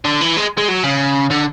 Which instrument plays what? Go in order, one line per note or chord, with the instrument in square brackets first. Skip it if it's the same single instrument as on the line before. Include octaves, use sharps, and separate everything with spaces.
[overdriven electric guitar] D3
E3
G#3
G#3
F#3
C#3
D3